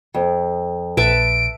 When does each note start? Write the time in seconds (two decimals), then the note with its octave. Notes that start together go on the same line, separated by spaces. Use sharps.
0.14 F2
0.97 A#1 B4 E5 A5 D7